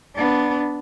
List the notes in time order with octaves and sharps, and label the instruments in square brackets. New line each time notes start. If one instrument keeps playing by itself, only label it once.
[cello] B3 D4